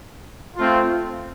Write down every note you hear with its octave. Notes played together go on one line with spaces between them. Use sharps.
A3 C4 F4